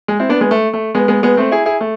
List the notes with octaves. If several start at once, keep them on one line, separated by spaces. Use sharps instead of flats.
G#3
C4 E4
B3 D4
G#3 B3
A3
A3
G#3 B3
G#3 B3
G#3 B3
A3 C4
E4 G#4
E4 G#4
A3